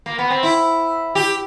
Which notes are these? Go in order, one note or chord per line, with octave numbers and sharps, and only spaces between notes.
A#3
B3
C4
E4
G4